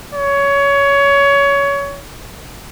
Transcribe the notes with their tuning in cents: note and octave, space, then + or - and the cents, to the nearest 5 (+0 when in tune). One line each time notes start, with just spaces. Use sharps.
C#5 +20